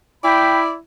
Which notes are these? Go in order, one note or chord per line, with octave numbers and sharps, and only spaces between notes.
E4 D5 G5 B5